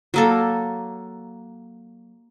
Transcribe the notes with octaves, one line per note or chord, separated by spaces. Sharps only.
F#3 A#3 A4